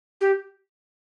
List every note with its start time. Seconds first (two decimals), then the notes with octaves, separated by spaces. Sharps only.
0.21 G4